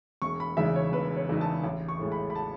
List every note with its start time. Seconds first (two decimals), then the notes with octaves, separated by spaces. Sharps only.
0.22 E1 C#6
0.40 B5
0.57 E2 C#3 G#3 D#4 E5
0.76 C#5
0.92 E1 B4
1.17 C#5
1.29 E2 C#3 G#3 D#4
1.41 A5
1.64 A1
1.89 C#6
1.99 A2 G#3
2.12 B5
2.30 B5
2.35 A5